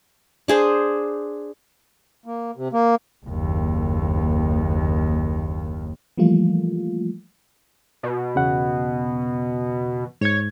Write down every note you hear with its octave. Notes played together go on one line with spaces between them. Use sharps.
D4 G#4 C5
A#3
C3
A#3
F#1 D#2
E3 F3 G3 A3 A#3 F4
B2
E2 C#3 F#5
G#2 C#5 G#6